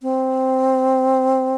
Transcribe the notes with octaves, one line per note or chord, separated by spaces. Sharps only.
C4